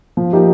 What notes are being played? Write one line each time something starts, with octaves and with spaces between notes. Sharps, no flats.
F3
A#3 D#4 G4